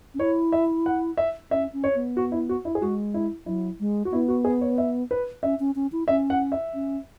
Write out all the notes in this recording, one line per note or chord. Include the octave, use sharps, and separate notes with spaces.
C#4
E4 C#5
E5
F#5
E5
C#4 E5
C#4
C#5
B3
F#4
E4
F#4
E4
G#4
G#3 F#4
E4
F#3 E4
G#3
F#4
B3 E4
F#4
G#4
C#5
E5
B4
C#4 E5
C#4
C#4
E4
C#4 E5
F#5
E5
C#4